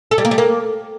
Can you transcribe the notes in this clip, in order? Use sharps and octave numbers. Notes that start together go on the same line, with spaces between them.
A4
G3
A#3
G3
A#3